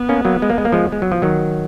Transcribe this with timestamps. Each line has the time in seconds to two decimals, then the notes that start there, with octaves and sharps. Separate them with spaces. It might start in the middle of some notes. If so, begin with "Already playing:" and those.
Already playing: B3
0.09 A#3 C#4
0.25 F#3 A#3
0.42 G#3
0.50 A#3
0.58 G#3
0.65 A#3
0.72 F3 G#3
0.92 G#3
1.02 F#3
1.12 F3
1.22 D#3 F#3